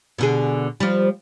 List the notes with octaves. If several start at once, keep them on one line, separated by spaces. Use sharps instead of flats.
B2 D3 G#4
F3 G3